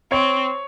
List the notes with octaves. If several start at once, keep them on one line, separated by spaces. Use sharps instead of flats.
C4 C#5